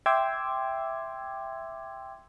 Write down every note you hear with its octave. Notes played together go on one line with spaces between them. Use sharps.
E5 G5 C6 D6 E6 G#6